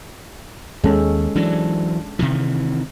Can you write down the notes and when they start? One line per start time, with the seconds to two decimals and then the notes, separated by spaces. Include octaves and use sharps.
0.84 D#2 G#3 C#4 A4
1.36 E3 F#3 D4
2.19 C3 D#3 E3